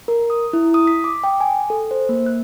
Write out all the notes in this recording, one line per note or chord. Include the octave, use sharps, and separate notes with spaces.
A#4
D#6
E4
D#6
B6
D6
G5
G#5
A4
C5
A#3
F#6